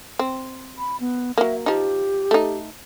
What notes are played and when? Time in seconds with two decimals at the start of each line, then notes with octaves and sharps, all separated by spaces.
0.19 C4
0.78 B5
1.00 B3
1.38 F#3 A#3 E5
1.66 F3 D#4 G4
2.31 A3 D#4